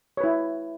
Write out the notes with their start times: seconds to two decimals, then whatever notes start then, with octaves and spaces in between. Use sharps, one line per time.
0.17 C#5
0.21 B4
0.24 E4